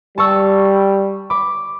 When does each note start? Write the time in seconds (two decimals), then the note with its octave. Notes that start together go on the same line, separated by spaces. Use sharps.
0.18 G3 A5 C#6 E6
1.30 B5 D6